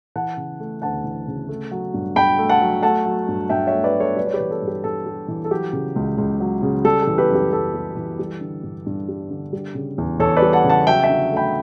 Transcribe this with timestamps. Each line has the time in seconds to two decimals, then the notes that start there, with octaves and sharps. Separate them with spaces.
0.16 E3 F#5 A5
0.37 C#3
0.60 A3
0.82 D2 F#5 A5
1.04 E3
1.27 C#3
1.49 A3
1.71 F#3
1.94 G2
2.16 G2 G5 B5
2.39 A3
2.49 F#5 A5
2.61 F#3
2.83 A3 F#5 A5
3.06 F#3
3.28 G2
3.50 G2 E5 G5
3.67 C#5 E5
3.73 A3
3.84 B4 D5
3.95 F#3
4.00 A4 C#5
4.16 G3 B4 D5
4.27 C#5
4.34 G4 B4
4.40 E3
4.51 A4
4.62 G2
4.68 G4
4.84 G2 A4
5.06 G3
5.28 E3
5.44 A4
5.51 F#3 G4
5.73 C#3
5.96 C#2
6.18 C#2
6.40 F#3
6.62 C#3
6.84 G3 A4
7.02 A4
7.07 E3
7.18 G4 B4
7.29 F#2
7.35 G4
7.53 F#2 A4
7.74 G3
7.97 E3
8.19 G3
8.41 D3
8.63 G2
8.86 G2
9.08 G3
9.30 D3
9.53 G3
9.75 C#3
9.98 E2
10.20 E2 A4 C#5
10.37 B4 D5
10.42 G3
10.53 F#5 A5
10.64 C#3
10.70 F#5 A5
10.87 F#3 E5 G5
11.04 E5 G5
11.10 D3
11.32 A3 G5 B5